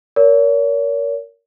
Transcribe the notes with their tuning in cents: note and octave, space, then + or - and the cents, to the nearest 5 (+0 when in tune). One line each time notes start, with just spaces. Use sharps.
A#4 +0 C#5 +35